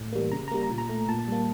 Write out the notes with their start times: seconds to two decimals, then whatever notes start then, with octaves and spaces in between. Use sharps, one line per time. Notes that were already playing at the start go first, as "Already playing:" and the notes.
Already playing: A2
0.13 E3 G3 A#3
0.32 C#3 A#5
0.48 A#5
0.51 G3 A#3
0.63 A#5
0.70 A#2
0.78 A#5
0.89 A3
1.09 A#2 A5
1.28 G3 A#3